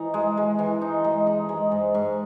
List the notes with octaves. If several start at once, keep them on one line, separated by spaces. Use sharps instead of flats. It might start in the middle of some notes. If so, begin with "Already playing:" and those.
Already playing: E3 D#4
G#3
G#3
E3
D#4
G#3
D#4
G#3
G#2
G#2